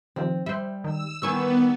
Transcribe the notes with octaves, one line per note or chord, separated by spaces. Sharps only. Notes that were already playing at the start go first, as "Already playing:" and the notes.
C3 D#3 F3 C4
G3 C5 E5
D#3 E6
D#3 E3 G3 B3 G#5 C#6 E6